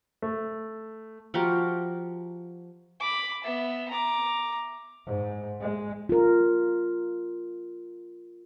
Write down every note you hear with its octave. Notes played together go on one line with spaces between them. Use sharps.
A3
F3 F#4 G4 A#4
B5 D6
B3 E5
A#5 D6
G#2
G#3
F4 A#4